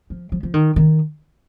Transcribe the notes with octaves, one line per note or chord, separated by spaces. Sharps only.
F3
F3
F3
D#3
D#3